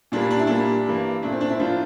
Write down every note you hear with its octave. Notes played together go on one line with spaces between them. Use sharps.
A#2 G3 A#3 D4
D4
E4
A#2 G3 A#3 D4
G2 E3 A#3
A#2 A3 D4
C4
D4
C4 E4
A2 F3 A#3 D4 F4